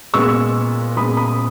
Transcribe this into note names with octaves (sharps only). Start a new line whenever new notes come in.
A#2 G#3 B3 C#6 E6
A#2 G#3 B3 B5 D#6
B5 D#6